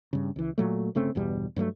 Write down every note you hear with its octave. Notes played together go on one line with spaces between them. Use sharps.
G2 C#3
C#2 E3
A#2 F#3 A3
G1 C#3 A3 C4
G1 E2 B2 G3
G2 F#3 G#3 A3